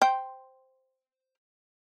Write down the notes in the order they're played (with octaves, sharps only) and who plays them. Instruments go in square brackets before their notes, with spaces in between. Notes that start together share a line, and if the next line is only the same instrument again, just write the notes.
[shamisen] C5 G5